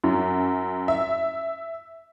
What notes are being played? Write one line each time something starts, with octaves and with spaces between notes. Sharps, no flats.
F#2
E5